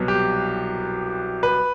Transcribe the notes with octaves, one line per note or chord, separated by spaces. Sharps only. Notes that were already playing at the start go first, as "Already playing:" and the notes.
Already playing: C2 B2 F#3
G4
B4